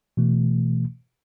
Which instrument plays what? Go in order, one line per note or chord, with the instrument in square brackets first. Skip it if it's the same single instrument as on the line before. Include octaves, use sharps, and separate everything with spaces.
[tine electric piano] B2 E3 A3